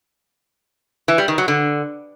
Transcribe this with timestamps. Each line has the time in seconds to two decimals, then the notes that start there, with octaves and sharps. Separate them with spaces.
1.08 E3
1.18 G3
1.28 D#3
1.38 F#3
1.48 D3